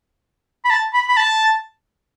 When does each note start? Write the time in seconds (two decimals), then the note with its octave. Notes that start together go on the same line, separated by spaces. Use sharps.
0.65 B5
0.70 A5
0.94 B5
1.08 B5
1.17 A5